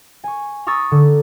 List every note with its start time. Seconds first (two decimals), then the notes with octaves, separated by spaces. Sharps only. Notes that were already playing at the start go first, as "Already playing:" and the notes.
0.24 G#5 C#6
0.67 A#5 C#6 D#6 E6 A6
0.91 D3